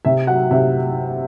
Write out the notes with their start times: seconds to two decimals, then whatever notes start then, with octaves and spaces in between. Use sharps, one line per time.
0.05 C3 E5
0.27 F#3 F#5
0.51 C3 E5